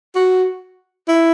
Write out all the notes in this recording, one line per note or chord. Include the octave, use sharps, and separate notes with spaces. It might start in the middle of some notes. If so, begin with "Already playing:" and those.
F#4
E4